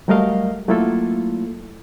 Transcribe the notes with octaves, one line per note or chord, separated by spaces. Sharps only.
F#3 G3 A3 A#4 D#5 F5
F#3 A3 A#3 E4 F4 A4